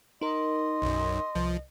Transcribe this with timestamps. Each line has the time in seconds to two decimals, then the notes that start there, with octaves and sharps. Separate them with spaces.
0.21 D#4 A#4 D#5 C6
0.82 B1 F#2
1.35 C2 F3